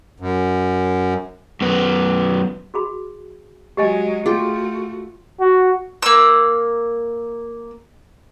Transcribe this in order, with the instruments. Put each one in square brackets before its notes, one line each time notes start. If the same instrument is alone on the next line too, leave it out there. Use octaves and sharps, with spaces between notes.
[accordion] F#2
[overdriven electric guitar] F#2 B3
[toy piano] F#4 G#4 B5
[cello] F#3 G#3 [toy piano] G4 D#5 G#5
[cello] A3 F#4 [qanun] F4 G5 [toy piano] G#4
[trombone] F#4
[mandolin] A#3 E6